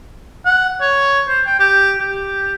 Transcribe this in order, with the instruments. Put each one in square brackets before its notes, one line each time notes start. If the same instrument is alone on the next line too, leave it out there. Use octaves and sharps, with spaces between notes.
[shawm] F#5
C#5
C5
G5
G4
G4